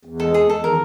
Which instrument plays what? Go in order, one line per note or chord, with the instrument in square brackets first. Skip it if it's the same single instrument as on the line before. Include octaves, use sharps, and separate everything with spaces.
[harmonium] E2
[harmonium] G#3 [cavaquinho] A4
[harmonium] E2 [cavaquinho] G#4
[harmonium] E2 [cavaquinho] A4
[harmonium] D#3 [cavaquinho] A#4